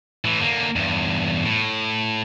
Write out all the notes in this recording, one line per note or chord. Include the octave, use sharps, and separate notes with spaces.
A2 E3
D3 A#3
E2 G2
A2